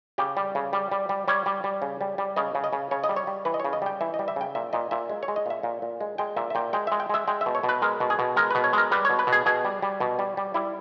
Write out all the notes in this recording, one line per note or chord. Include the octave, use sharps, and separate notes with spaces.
C#3 G4
G3
C#3
G3
G3
G3
G3 C#5
G3
G3
C#3
G3
G3
C#3 D#5
C#3
D#5
C#3
C#3 C#5
D#5
G3
C#5
G3
E3 B4
D#5
C#3 C#5
D#5
G3 G5
E3 E5
D#5
G3
E5
C#3 G5
A#2 E5
A#2 D#5
A#2 E5
G#3
C#5
G#3
D#5
A#2 E5
A#2
A#2
G#3
G#3 G5
A#2 E5
E5
A#2 G5
G#3 G5
G#3 E5
G5
G#3 E5
G#3 G5
E5
B2
C#5
B2
B4
G#3 A#4
B2
G#4
B2
G#3 A#4
B2 B4
C#5
G#3 A#4
G3 B4
B2 C#5
B4
B2
G#4
B2 G#4
G3
G3
B2
G3
G3
G3 E4